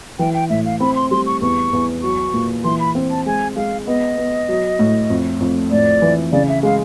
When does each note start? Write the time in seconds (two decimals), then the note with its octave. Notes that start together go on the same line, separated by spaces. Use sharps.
0.19 E3 G5
0.34 G5
0.50 A2 E5
0.65 F5
0.80 C4 B5
0.96 C6
1.11 G3 C6
1.26 C#6
1.42 E2 C#6
1.73 E2
2.03 F#3 C#6
2.34 A#2
2.64 E3 C6
2.80 B5
2.95 C4
3.11 A5
3.26 G#3 G#5
3.56 G#3 F5
3.87 B3 D#5
4.17 B3
4.49 F#3
4.79 A2
5.10 F2
5.40 F2
5.71 A2 D5
6.02 E3
6.32 C#3 D5
6.49 E5
6.63 G#3 F5